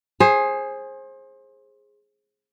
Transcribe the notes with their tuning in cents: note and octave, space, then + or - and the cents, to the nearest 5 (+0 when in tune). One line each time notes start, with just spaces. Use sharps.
G#4 +0 C5 +30